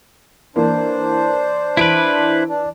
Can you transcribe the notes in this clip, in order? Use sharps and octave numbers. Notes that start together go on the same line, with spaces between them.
E3 A#3 D4 C5
E3 E4 B4 D7
D4